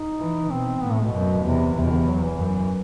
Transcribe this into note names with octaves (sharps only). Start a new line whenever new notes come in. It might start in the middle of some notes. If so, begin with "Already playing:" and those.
Already playing: D#4
E3
B2 C4
A2 B3
A3
B2
F#2
E2 C3
E2 C3
B2
D#3
C3
F#3
E3
F#2